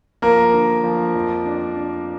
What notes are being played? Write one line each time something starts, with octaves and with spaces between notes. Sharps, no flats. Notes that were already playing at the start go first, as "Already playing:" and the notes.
F3 A#3 A#4
D3
F3
F2
D4
D4